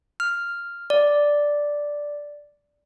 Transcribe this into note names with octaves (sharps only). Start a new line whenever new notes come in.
F6
D5